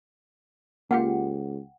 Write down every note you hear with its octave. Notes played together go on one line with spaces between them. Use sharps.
C#2 A#3 F4 G4 F#5 G5